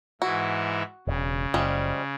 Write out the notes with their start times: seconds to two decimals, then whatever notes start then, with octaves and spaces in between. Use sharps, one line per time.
0.22 G#2 E3 E4 F#4
1.07 E1 C#3
1.54 F#1 F3 G3 G#3